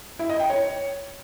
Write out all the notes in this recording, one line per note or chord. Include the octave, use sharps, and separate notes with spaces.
E4
D#5
G5
C#5